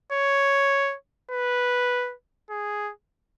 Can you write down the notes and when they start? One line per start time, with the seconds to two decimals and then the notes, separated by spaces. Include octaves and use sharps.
0.13 C#5
1.31 B4
2.50 G#4